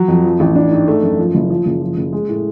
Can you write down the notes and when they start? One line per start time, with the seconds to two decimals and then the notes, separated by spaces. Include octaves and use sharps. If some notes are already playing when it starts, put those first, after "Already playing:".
Already playing: F#3
0.08 F2
0.24 F3
0.40 A1
0.55 D4
0.71 G#2
0.88 A3
1.03 F#2
1.18 F3
1.35 F#1
1.50 F3
1.66 F#1
1.81 F3
1.97 F#1
2.12 G#3
2.29 A2